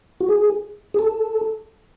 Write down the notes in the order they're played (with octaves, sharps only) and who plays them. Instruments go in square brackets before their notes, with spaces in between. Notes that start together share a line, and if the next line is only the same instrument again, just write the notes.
[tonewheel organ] F#4
G#4
G#4
A4